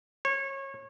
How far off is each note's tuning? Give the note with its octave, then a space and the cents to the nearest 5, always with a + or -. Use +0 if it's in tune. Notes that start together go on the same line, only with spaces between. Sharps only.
C#5 -25